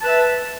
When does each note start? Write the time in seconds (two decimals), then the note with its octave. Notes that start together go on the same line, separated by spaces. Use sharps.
0.01 A5
0.03 B4
0.06 E5